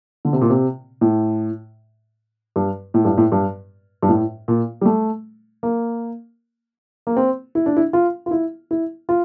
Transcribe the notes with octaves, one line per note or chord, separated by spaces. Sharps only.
D3
C3
A#2
C3
A2
G2
A2
G2
A2
G2
G2
A2
A#2
G3
A3
A#3
A#3
C4
E4
D4
E4
F4
F4
E4
E4
F4